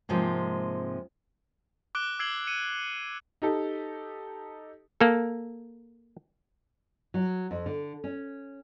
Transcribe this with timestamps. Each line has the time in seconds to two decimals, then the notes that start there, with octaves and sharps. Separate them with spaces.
0.09 G#2 C3 F3 G#3 A#3
1.95 D6 F#6 D7 G7
2.19 E6 G#6 C7 D7 F#7 G7
2.47 C#7 D#7
3.42 D#4 G4 A4
5.01 A#3 A4
7.14 F#3
7.51 F2
7.66 D3
8.04 C#4